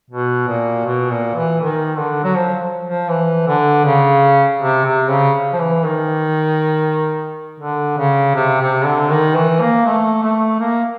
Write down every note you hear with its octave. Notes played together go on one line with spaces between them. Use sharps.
B2
A#2
B2
A#2
E3
D#3
D3
F#3
F3
F3
E3
D3
C#3
C3
C3
C#3
F3
E3
D#3
D3
C#3
C3
C3
D3
D#3
E3
A#3
A3
A3
A#3